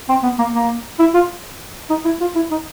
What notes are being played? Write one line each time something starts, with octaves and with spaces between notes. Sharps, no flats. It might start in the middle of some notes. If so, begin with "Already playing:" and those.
C4
B3
A#3
A#3
E4
F4
D#4
E4
F4
E4
D#4